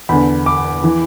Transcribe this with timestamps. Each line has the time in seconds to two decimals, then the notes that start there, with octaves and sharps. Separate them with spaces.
0.09 E2 D3 B5
0.46 D6
0.84 E3